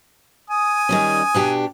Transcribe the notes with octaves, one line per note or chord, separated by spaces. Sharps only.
G#5 D#6
D#3 G3 C#4
B2 D4 G4